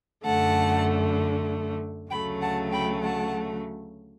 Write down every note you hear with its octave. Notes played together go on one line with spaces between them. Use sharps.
F#2 D3 A3 F#5 A5
D2 C#3 F#3 A3 G5 B5
F#5 A5
G5 B5
F#5 A5